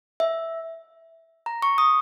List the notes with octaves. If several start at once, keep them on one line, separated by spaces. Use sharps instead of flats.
E5
A#5
C#6
D#6